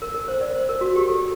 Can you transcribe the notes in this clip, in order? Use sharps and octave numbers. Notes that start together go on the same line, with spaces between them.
A#4
A#4
C5
D5
C5
A#4
F#4
G4
A4